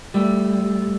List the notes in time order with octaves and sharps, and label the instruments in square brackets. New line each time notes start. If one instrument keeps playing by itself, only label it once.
[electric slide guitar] G3 A3